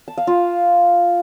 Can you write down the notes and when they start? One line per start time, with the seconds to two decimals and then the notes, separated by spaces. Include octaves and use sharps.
0.08 A5
0.18 F5
0.27 F4